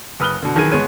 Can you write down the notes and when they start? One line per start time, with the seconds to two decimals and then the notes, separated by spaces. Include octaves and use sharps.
0.20 F#1 B4 D#6 F6 F#6 G7
0.43 B2 D3
0.55 B1 D#3 E3 G#4 G#6 D#7
0.72 G1 G#3 B3 C#5 D#7